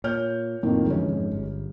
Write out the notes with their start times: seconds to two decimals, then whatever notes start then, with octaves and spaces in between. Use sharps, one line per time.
0.04 A#2 C#5 F6 G6
0.63 F2 A2 D#3 A#3
0.86 F2 D3 E3 G#3 C#4
1.08 F2 G#2
1.31 G1